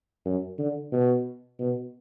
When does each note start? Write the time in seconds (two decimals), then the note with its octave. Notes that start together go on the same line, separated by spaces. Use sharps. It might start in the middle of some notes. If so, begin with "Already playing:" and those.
0.25 F#2
0.58 D3
0.92 B2
1.59 B2